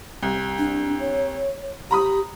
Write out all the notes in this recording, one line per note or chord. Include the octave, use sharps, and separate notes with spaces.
C2
D4
C#5
G4 A#5 B5 D#6